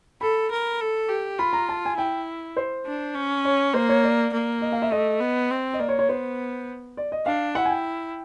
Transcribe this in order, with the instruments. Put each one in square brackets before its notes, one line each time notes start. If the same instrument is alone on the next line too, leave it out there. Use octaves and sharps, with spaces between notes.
[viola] A4 [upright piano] B5
[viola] A#4
A4
G4
[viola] F4 [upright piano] B5
[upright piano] A#5
A5
G#5
[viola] E4 [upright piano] G5
[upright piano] C5
[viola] D4
C#4
[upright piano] C#5
[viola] A#3 [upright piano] C5
[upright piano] C#5
D5
[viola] A#3
[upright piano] D#5
F5
E5
[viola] A3 [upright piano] D#5
[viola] B3
C4
[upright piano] D#5
[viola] A#3 [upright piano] D5
[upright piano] C#5
C#5
[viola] B3 [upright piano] C5
[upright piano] D5
D#5
[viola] D4 [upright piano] F5
[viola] E4 [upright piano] F#5
[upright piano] G#5
G5